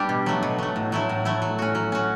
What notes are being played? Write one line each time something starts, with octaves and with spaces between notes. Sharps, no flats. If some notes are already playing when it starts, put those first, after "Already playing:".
Already playing: G3 B3 D4 G4
B2
F#3 A3
B2
F#3 A3
A2
F#3 A3 E4
A2
F#3 A3 E4
F#3
C#4 F#4
F#3
C#4 F#4